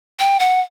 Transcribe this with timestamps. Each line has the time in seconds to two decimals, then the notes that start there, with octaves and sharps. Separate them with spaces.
0.20 G5
0.40 F#5